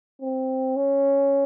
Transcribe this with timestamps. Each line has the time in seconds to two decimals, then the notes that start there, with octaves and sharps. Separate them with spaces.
0.22 C4
0.76 C#4